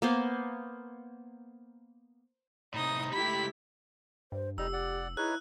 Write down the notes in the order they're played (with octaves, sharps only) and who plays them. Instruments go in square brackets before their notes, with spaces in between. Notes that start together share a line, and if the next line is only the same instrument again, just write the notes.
[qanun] A#3 B3 C5
[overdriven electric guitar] A2 C3 [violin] D#4 D#6
[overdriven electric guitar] C#2 B5 [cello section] A3 E4 G4 [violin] B6
[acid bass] G2 [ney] C5
[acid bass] F1 [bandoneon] G3 D#4 A#5 [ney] G4 [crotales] E6
[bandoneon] D5 F#5
[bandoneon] D#4 B4 C#5 [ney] E4 [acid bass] G#4 [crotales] F#6